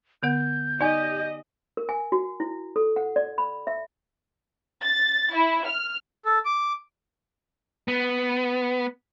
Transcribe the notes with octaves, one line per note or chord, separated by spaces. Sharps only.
D3 B3 F#5 G6
D#4 G4 D5 D#5 G#5
A#4
G#5
F#4
E4
A4
F#5
D5
B5
E5
A6
E4
F6
A4
D6
B3